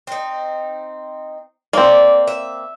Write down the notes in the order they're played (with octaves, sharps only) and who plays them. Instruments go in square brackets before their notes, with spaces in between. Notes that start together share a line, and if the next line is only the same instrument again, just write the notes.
[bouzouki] C4 D#4
[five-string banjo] A#3 C4 [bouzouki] D5
[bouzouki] E5